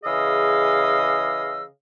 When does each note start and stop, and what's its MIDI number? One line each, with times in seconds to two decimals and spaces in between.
0.04 1.63 49
0.04 1.63 52
0.04 1.63 68
0.04 1.63 75
0.04 1.63 77
0.04 1.63 88